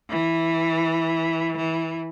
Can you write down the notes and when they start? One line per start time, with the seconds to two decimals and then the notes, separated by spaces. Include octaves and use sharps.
0.10 E3
1.57 E3